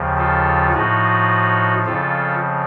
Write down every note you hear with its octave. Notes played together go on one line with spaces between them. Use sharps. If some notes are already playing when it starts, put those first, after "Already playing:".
Already playing: D#2 C#3 F3
F4 A4
A2 F3 D#4 F#4
F2 C#3 F3 F4 A4